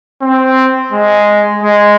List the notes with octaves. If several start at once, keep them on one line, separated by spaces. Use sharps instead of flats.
C4
G#3
G#3